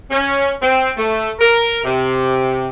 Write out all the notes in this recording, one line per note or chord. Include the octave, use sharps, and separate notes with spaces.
C#4
C4
A3
A#4
C3